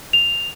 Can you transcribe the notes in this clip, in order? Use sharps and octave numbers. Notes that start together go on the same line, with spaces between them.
F7